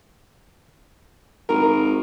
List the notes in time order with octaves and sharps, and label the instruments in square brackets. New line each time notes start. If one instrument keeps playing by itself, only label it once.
[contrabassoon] G#1 [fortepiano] A#4